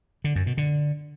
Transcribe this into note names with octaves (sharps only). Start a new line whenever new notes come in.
D3
F#2
B2
D3